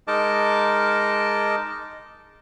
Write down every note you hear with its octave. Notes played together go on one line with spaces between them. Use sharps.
G#3 D#4 A#4 D#5 A5 D6